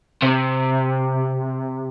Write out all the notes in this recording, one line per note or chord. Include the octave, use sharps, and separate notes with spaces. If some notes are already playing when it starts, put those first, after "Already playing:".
C3